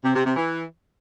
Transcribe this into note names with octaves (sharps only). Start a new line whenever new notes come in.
C3
C3
C3
E3